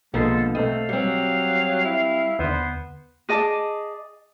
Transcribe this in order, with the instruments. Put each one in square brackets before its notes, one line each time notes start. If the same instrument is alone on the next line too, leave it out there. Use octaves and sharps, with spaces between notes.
[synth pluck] B1 A#3 C7 [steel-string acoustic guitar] B2 D3 F3 [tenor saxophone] G#3 [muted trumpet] A4
[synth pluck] B2 D#5 [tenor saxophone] A3 [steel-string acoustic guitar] C4 [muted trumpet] F5
[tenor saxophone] F#3 [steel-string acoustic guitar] G3 C4
[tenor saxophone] E4
[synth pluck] D#2 D3 [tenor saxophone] B3 [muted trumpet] C5
[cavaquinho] G#4 D#5 A5 D6